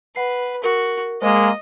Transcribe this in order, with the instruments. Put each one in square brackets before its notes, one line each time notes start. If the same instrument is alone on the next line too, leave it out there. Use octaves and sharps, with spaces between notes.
[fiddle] B4 [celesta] F#5 C7
[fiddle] F#4 [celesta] A#4
[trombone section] G#3 A#3 [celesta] C5 [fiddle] D#5